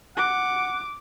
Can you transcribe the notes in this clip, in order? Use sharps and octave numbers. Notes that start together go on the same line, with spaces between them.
F#5 D6